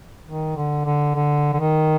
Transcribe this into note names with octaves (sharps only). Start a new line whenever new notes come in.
D#3
D3
D3
D3
D3
D#3